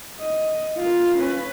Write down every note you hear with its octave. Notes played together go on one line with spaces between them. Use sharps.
D#5
F4 A#4
C#4 B4